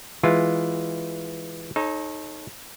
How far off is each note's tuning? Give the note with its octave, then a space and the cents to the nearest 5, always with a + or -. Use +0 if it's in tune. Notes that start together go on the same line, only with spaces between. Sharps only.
E3 +0 G#3 +0 F4 +0
D#4 +0 A4 -30 C#5 -30